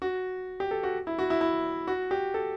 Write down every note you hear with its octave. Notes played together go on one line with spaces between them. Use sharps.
F#4
G4
A4
F#4
E4
F#4
E4
E4
F#4
G4
A4